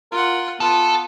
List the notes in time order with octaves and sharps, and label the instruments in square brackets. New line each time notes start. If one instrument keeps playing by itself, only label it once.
[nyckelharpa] F4 F#5 [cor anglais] A#4
[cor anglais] B3 [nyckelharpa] F4 [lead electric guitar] A4